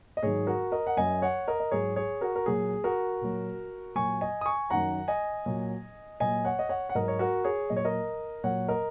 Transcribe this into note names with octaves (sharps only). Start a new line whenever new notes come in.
D#5
G#2 D#3 F#3 G#4 C#5
F#4 A#4
A#4 D#5
F#5
F#2 F#3 D#5 G#5
C#5 F#5
A#4 D#5
D#5
G#2 F#3 G#4 C#5
G#4 C#5
F#4 A#4
A#4
A#2 F#3 G#4
F#4 A#4
A#2 F#3
A#2 F#3 G#5 C#6
D#5 G#5
D#6
G#5 C#6
F#2 D#3 F#3 F#5 A#5
D#5 G#5
A#2 F#3
A#2 F#3 D#5 G#5
C#5 F#5
D#5
C#5 F#5
F#5
G#2 F#3 A#4 D#5
C#5
F#4 A#4
G#4 C#5
A#2 F#3 D#5
C#5
A#4 D#5
A#2 F#3 C#5 F#5
A#4 D#5